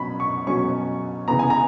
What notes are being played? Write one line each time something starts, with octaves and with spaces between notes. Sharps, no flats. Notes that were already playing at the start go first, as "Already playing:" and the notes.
Already playing: B2 F#3 C#4 B5
C#6
B2 F#3 C#4 C#6
C#3 E3 B3 A#5
G#5
A#5